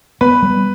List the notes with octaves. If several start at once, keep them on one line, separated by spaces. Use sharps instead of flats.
B3 B4
G3